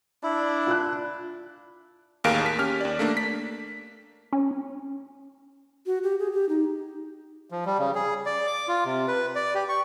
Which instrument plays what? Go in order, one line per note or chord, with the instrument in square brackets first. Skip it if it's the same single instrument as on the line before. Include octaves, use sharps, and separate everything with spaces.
[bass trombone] D4 [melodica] E4
[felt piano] F4 F#6
[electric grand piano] A1 D#2 G#4 A#4 F5 D7
B6
C#4 G4 F6
D#2 D5
A3 A#3 D4
B6
[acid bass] C#4
[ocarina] F#4
G4
G#4
G4
D#4
[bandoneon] F3
G3
C#3
G#4
D5
D6
F4
C3
B4
D5
G4
C#6